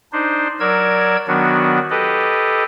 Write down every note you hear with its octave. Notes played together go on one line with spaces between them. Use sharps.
D4 D#4 C5
F#3 A#4 D5 E6 G#6
D#3 F#3 B3 D4 F#4
G4 A4 B4 D#5